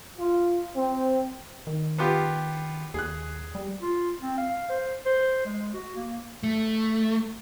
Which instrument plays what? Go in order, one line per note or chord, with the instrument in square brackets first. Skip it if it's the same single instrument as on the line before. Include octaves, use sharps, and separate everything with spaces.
[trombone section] F4
C4
[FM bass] D#3
[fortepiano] B3 F4 G4
[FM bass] D#2 [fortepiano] G#4 F#6
[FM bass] G3
[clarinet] F4
C4
F5
C5
C5
G#3
F#4
A#3
[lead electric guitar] A3